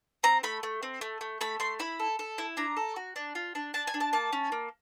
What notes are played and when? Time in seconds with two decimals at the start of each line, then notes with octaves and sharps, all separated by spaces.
0.23 C4 A#5
0.43 A3 B5
0.63 A3
0.83 C4
1.01 A3
1.21 A3
1.41 A3 B5
1.60 A3 C6
1.79 E4 B5
2.00 A4
2.19 A4
2.38 E4
2.57 D4 A#5
2.77 A4
2.96 F#4
3.16 D4
3.35 F4
3.55 D4
3.74 D4 A5
3.87 G#5
3.94 D4
4.00 A5
4.13 A#3 A5
4.33 C#4
4.52 A#3